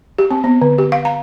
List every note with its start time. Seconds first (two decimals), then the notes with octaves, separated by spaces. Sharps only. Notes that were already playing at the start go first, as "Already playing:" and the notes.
0.18 G4
0.31 C4
0.44 B3
0.62 D3
0.78 G4
0.92 F5
1.05 A#5